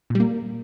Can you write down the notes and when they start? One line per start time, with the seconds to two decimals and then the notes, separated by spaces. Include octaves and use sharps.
0.10 A#2
0.15 G3
0.20 A#3